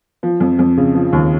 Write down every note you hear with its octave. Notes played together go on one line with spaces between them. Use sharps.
F3
F2
F2
C#3
F3
D#2